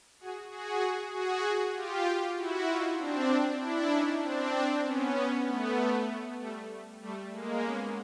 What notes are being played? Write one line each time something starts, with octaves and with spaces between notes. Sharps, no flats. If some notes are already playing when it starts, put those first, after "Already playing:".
F#4 G#4
F#4 G#4
F#4 G#4
F4 G4
E4 F#4
D#4 F4
C4 D4
D4 E4
C#4 D#4
C4 D4
C4 D4
B3 C#4
B3 C#4
A3 B3
A3 B3
G3 A3
G3 A3
G#3 A#3
B3 C#4